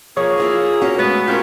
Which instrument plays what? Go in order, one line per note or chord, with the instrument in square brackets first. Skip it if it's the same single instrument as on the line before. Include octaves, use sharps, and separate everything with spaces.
[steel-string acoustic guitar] F3 [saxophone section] A#3 G#4 [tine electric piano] C#5
[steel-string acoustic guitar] E4 F4 C5
[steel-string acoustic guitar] C#4 F4 [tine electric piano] F#4
[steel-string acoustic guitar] G#3 A3 [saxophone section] B3
[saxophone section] G3 C4 C#4 [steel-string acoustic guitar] F4 A#4